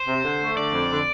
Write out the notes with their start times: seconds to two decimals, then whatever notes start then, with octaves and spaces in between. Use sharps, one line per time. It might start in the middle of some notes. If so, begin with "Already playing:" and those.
Already playing: C5
0.08 C3
0.25 D3
0.41 A3
0.57 D3 D5
0.73 F2
0.90 D3